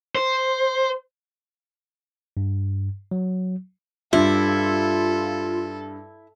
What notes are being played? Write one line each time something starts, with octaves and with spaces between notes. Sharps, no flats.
C5
G2
F#3
G2 E4 F4 A4